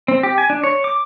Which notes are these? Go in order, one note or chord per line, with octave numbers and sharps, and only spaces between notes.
C4
G4
G#5
D4
C#5
D6